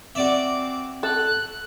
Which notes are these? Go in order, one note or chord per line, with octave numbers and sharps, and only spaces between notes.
C4 F#4 D5 E5 D6
A4 F#6